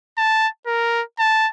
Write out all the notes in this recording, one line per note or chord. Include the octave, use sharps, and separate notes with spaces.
A5
A#4
A5